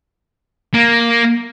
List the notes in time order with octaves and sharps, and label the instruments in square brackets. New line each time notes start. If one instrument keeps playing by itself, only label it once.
[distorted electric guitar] A#3